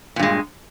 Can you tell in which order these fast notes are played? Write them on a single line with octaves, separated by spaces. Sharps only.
A#2 G2 G#3